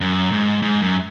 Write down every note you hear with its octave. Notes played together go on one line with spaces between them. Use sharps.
F#2
G#2
G#2
F#2